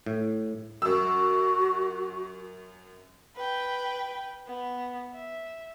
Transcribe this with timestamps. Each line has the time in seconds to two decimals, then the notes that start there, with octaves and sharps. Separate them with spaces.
0.06 A2
0.82 F#2 F#4 E6
3.36 B4 G5
4.47 B3
5.13 E5